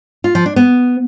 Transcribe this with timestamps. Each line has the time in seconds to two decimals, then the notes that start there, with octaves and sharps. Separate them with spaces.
0.24 F4
0.35 F3
0.46 D4
0.56 B3